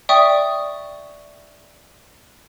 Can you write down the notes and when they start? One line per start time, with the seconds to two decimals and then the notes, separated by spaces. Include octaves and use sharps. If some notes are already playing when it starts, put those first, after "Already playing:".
0.09 D5 E5 G5 C#6 D#6